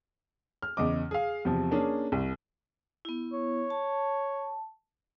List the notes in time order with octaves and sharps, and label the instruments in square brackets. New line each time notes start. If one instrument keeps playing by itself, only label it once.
[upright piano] F6
E2 C#3 D#5 D6
G#4 F5
E2 C3 F3
A#3 C#4 D4 G#4
C2
[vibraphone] B3 E4
[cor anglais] C#5
[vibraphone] A5